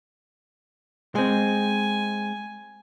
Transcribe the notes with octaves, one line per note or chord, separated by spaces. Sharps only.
G#3 C4 G#5